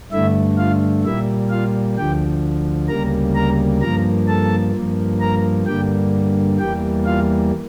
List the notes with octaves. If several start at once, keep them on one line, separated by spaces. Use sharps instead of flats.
G2 D3 A3 E4 E5
F4 F5
A#2 G3 A#3 E4 E5
F4 F5
D2 D3 F3 G4 G5
D2 C#3 G3 A#3 A#4 A#5
A#4 A#5
G2 F3 A#3 A#4 A#5
A4 A5
G2 F3 A#3
A#4 A#5
G2 D3 G3 A#3 G4 G5
E2 E3 G3 A#3 G4 G5
F4 F5